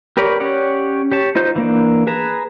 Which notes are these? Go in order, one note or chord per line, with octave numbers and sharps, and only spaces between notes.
G4 A#4 B4 C#5 D5
C#4 G4 C#5 D5 F#5
G4 C#5 A5
D#4 F4 C5 G6
E3 A#3 D4
G#4 B4 A5 A#5